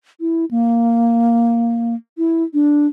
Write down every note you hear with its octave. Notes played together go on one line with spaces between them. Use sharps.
E4
A#3
E4
D4